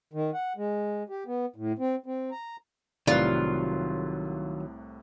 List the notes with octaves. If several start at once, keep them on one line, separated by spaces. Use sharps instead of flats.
D#3
F#5
G#3
G4
B3
A2
C4
C4
A#5
C2 A2 C3 D#3 F#3 F4 B4 D5